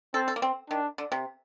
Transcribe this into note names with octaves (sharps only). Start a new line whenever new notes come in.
C4 A4
A4
A#3
C4
D#3 D4
D3
C3